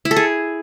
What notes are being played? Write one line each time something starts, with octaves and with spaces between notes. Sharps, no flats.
E4
A4
G#4